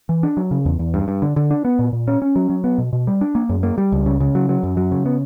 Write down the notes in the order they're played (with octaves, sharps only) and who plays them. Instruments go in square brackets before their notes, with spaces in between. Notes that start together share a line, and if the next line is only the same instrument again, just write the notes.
[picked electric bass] E3
D4
F#3
C#3
E2
E2
G2
G2
D3
D3
D4
B3
A#2
A#2
C#4
C#4
F#3
F#3
B3
B2
B2
G3
D4
A#3
F#2
A#3
G3
C#2
C#3
C#3
F#3
F#3
F#2
F#3
C#3
B3